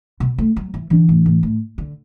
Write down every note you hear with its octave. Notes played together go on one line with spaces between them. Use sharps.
B2
A3
F#3
E3
D3 E3 D4
A2
A2
A2
D3